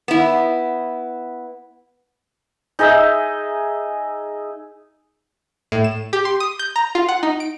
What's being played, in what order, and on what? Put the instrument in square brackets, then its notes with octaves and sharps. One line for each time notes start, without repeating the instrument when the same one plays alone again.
[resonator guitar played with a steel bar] B3 E4
[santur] D#4 G#4 D#5 E5
[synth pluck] A2
E7
G4
C6
D#6
G6
A#5
F4
F#5
D#4
D7